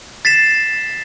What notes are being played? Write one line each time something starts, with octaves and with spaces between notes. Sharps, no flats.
A6 B6 C7 E7